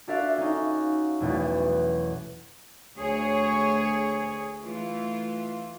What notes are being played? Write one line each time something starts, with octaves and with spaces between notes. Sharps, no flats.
D4 F4 F#4 A4 E5 F5
C#4 D#4
B1 E2 B2 A3
D2 G#4 C#5
E3 A3 F4